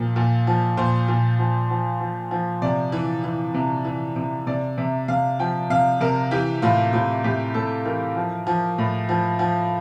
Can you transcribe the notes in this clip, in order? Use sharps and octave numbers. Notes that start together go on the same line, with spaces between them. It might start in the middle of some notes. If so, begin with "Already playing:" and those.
Already playing: A#2 F3 A#4
A#2
F3
A#2 C5
A#2
F3
F3
F3
F3
C3 D5
E3
E3
C3
E3
C3
C3 D5
C3 E5
C3 F5
F3 G5
C3 F5
C3 A#4
E3 G4
A2 F4
A2 F4
A2 G4
A2 A4
E3 A#4
F3
F3
A2
F3
F3